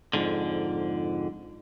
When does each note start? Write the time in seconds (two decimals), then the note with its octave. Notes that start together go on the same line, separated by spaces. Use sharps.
0.13 F2 G#2 D3